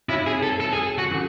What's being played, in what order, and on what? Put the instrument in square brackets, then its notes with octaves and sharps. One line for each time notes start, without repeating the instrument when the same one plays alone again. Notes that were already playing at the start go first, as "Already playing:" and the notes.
[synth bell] C4 D#4 F#4 C#5 [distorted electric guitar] E4
[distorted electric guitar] G#4
A4
A4
G#4
F#4
[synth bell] D#3 F#3 C#4 E4 A4